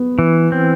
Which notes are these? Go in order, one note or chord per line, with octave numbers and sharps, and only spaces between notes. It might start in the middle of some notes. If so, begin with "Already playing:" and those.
Already playing: B3
E3
C4